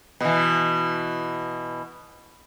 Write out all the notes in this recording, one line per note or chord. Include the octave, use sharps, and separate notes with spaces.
B2 E3